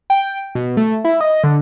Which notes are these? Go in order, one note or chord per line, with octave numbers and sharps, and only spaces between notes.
G5
B2
A3
E4
D#5
D3